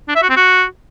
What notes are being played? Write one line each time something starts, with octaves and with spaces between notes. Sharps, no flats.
D4
E5
F#4
C4
F#4